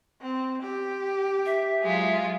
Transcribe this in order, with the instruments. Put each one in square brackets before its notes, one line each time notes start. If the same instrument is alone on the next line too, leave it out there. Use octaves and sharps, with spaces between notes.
[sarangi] C4
G4
[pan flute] E5
[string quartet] F#3 G#3 F4